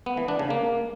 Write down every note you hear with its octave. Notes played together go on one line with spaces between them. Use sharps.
B3
E3
D4
C#3
A#3